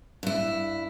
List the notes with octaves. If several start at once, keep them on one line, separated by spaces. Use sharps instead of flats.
G2 E4